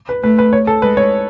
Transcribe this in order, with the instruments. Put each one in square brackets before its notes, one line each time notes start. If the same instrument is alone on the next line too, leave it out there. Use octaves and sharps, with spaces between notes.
[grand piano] B4
[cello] A3 [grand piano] B4
[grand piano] B4
C#5
A4
[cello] G#3 [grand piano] B4
[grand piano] C#5